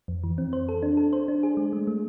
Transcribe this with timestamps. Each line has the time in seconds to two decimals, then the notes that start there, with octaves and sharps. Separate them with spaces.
0.08 F2
0.23 E3
0.38 C4
0.53 C5
0.69 A4
0.83 D4
0.97 A4
1.13 C5
1.28 D4
1.43 G#4
1.57 G#3
1.73 A3
1.87 A3